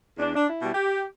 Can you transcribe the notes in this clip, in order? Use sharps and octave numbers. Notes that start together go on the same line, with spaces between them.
E2 D4
D4
E4
B2 G3
G4